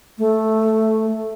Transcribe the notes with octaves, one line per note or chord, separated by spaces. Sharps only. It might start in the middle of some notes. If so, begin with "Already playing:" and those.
A3